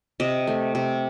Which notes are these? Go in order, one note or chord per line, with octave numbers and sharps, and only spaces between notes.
C3 D#5
A3
C3